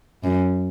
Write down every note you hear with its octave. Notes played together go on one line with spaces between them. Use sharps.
F#2